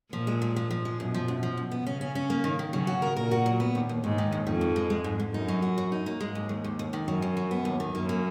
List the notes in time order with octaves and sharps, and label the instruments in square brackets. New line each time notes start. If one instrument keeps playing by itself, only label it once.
[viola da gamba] A#2 [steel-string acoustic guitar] F3
[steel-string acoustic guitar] G#3
F3
F3
F3
G#3
[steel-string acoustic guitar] F#2 [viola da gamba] B2
[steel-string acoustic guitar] F3
F#2
F3
F#2
B3
[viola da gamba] C#3 [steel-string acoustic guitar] C#4
[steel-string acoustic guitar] C#4
C#4
A#3
D#3
D#3
[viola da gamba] C#3 [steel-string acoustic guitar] F#3
[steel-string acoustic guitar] F#4
A#4
[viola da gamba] A#2 [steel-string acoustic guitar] A#4
[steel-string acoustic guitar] F#4
F#3
B3
D#2
D#2
[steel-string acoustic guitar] D#2 [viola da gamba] G#2
[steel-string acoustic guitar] D#3
D#2
[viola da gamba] F2 [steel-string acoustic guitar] D#3
[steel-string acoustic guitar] G#2
G#3
G#3
G#2
G#2
[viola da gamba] F#2 [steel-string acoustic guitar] D#4
[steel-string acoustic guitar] F#3
F#4
F#3
D#4
A#3
[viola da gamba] G#2 [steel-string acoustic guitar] G#3
[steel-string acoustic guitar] D#2
D#2
D#2
D#2
D#3
[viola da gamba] F#2 [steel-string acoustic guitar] F#3
[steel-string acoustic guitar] F#3
F#3
B3
D#2
D#3
[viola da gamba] F#2 [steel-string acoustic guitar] A#3
[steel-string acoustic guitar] A#3